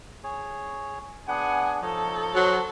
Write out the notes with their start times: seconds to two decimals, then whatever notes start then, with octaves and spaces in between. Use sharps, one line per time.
0.24 G#4 C#5
1.28 B3 D4 G#4 F#5 G#5
1.82 F3 D#4 A4 C#5 D#5
2.35 F#3 C5